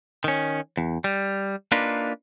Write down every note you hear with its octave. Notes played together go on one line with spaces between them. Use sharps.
D#3 C#4
E2
G3
A#3 D4 D#4 F4 B4